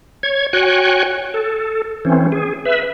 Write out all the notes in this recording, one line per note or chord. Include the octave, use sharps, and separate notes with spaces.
C#5 G#6
F#4 C#5 G5 G#5 F#6
A4
E3 C4 C#4
G#4
B4 E5